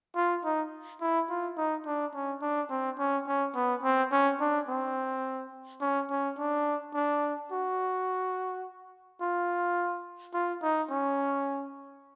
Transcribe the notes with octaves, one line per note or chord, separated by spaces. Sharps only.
F4
D#4
E4
F4
D#4
D4
C#4
D4
C4
C#4
C#4
B3
C4
C#4
D4
C4
C#4
C#4
D4
D4
F#4
F4
F4
D#4
C#4